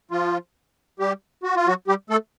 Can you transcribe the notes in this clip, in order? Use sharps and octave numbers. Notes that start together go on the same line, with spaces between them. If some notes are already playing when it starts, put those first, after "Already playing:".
F3 F4
G3 G4
F#4
F4
F#3 F#4
G3 G4
A3 A4